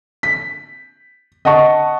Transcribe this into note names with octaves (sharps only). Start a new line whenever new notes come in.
B6
D#5 F#5 A5 C#6